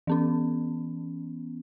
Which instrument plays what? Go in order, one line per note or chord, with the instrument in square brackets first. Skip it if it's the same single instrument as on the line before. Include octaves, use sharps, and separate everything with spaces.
[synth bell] E3 B3 C#4